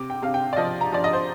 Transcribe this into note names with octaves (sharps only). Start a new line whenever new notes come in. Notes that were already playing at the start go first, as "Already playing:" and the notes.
Already playing: C3 D6
G5
C3 F5
G5
D5
F3 D#5
A#5
F3 D5
D#5
C5